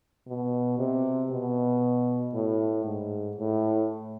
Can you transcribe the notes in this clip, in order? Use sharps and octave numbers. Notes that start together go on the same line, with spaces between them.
B2
C3
B2
A2
G#2
A2